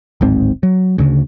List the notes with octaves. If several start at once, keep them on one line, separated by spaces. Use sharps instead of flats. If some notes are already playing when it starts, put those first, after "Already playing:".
D1 G#1 G#2 C4
F#3
D2 C#3